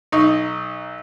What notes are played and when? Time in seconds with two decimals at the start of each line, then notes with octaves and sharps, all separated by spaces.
0.12 B1 D#4 C#6